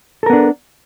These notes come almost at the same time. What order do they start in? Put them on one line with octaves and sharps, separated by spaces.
A4 A#4 B3 D4